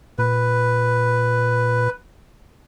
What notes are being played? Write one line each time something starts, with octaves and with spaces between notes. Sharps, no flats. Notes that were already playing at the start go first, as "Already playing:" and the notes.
A#2 B4